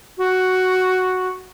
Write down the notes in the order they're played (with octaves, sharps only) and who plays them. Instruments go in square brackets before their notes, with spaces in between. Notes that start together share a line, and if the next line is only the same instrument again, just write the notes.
[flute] F#4